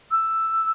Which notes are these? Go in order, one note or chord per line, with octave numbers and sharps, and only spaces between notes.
E6